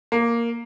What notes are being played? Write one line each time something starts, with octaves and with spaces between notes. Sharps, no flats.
A#3